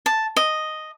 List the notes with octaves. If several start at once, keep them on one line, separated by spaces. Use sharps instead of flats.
A5
D#5